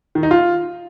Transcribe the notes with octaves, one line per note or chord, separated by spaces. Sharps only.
D#3
D#4
F4